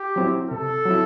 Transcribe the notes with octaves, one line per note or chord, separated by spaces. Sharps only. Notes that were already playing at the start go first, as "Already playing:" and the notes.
Already playing: G4
F#3 C4 E4
C3 A4
F#3 C4 E4